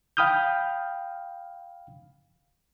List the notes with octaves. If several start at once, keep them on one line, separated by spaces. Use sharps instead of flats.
F5 G5 B5 D#6 F6 G6